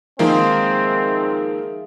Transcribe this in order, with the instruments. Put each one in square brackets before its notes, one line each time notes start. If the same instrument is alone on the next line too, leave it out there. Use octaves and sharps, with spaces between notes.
[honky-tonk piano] D#3 F3 A#3 [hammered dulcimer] G#3 E5 F5 [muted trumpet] C4